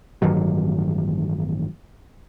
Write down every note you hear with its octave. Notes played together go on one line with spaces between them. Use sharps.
A1 G2 D#3 F#3